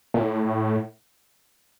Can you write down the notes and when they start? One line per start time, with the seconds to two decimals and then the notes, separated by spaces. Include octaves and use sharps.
0.14 A#2
0.19 A2